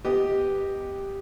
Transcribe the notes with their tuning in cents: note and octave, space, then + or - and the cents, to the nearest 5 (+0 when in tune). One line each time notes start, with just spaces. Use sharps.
B3 +0 G4 +0 D#5 +0